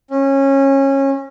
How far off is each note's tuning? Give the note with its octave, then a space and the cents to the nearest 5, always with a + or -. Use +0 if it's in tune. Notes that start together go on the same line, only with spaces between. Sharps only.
C#4 -20